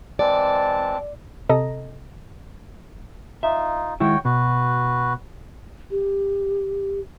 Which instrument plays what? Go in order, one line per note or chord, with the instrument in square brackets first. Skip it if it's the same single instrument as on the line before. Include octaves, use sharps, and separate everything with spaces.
[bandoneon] E3 G#3 C4 [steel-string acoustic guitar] D5 [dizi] A5
[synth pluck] C3 A4 D#5 A#5 A#6
[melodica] D#4 F4 [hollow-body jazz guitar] E5
[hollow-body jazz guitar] D#3 G#3 E4 [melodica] F#4 C#5 G5
[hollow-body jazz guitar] B2 [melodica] F#4 B4
[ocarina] G4